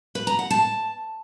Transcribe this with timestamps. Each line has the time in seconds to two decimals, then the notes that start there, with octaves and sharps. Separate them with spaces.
0.15 B4
0.27 A#5
0.39 F#5
0.51 A5